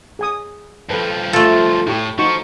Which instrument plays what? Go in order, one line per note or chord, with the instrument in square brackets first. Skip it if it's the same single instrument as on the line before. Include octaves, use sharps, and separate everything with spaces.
[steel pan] G#4 G#5 D#6
[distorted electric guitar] G2 F3 [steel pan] A4 B4
[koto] A3 A4 [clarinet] F4 [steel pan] F5
[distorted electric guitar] A2 [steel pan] E4 G4 C#6
[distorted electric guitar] F3 [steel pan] D#4 F#4 [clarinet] C#6